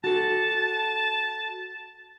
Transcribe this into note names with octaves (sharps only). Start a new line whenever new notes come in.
F#4 A4 A5